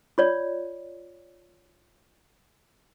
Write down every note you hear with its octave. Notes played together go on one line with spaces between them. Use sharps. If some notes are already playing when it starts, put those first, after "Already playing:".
F4 C#5 D5